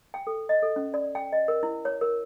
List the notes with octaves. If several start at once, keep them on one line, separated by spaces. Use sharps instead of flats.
G5
A4
D#5
A4
C#4
D5
G5
D#5
A#4
E4
C#5
A#4